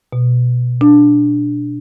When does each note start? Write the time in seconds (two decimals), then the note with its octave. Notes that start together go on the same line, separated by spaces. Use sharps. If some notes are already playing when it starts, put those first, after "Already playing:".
0.13 B2
0.81 D4